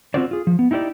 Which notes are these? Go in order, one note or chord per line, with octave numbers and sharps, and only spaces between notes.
C4 C#4 F4 F#4 C5 D5
F4 G#4
F3
B3
D#4 E4 G4 B4 D5